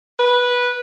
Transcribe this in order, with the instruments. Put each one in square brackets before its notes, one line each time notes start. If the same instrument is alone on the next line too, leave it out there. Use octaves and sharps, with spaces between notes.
[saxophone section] B4